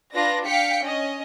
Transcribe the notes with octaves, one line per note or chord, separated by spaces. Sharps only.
D4 F4 B4 D5 A#6
F5 G5 B6 C#7
C#4 D#5